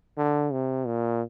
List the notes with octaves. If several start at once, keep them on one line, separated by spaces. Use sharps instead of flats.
D3
C3
A#2